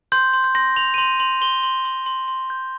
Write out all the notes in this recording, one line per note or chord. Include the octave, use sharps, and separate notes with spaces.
C6 G6
C6
G6
C6 A#6
C6 F7
D#7
C6 F7
C6 F7
C6 G7
C6
C6
C6
C6
G6